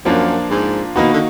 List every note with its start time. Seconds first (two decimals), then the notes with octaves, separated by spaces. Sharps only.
0.05 F#2 F3 A#3 D4 F4
0.50 G#2
0.96 B2 D#3 A#3 D#4 F#4
1.14 D3